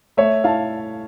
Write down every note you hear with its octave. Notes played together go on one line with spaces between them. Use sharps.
A3 C#5 E5
E4 F5 A5